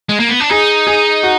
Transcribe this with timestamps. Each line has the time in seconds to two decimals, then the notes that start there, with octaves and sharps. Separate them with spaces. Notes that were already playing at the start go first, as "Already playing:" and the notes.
0.09 G#3
0.20 A#3
0.29 B3
0.40 D4
0.50 D#4 G#4
0.87 G#4
1.23 F#4